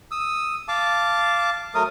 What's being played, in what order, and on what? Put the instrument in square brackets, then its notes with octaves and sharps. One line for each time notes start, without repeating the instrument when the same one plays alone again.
[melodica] D#6 E6
F5 A5 D6
F#3 A3 A#4 D#6